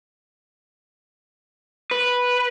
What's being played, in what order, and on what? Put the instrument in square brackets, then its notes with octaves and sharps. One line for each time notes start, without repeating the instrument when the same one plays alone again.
[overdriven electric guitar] B4